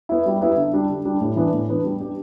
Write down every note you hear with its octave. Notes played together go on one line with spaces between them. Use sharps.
B3 E4
G3
B3 E4
D3
G3 D4
D3
G3 D4
A2
E3 B3 D4
A2
E3 B3 D4
G3
B3 D4 G4